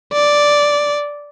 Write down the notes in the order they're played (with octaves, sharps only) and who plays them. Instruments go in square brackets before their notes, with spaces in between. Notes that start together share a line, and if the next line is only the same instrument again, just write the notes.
[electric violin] D5